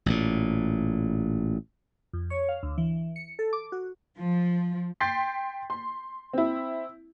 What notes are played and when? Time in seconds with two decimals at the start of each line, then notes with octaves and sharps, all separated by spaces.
0.06 A1 A#2
2.13 F2
2.30 C#5
2.49 F5
2.63 D2
2.78 E3
3.16 C#7
3.39 A4
3.53 D6
3.72 F#4
4.19 F3
5.00 G5 C6 G6 A6 B6 C7
5.70 C6
6.33 C4 E4